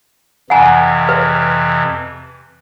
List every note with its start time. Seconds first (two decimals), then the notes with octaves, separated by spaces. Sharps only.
0.50 F2 C3 E3 F#5 G#5 A#5
1.09 B4